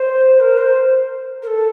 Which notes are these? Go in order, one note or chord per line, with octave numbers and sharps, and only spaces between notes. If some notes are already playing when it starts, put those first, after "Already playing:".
Already playing: C5
A#4
C5
A#4
A4